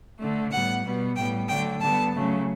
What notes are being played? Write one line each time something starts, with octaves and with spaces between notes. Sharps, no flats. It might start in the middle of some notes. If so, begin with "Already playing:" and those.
D3 A3
A2 G3 B3 F#5
B2 G3 B3
A2 G3 B3 G5
D3 F#3 A3 G5
D3 G3 B3 A5
C#3 F#3 A3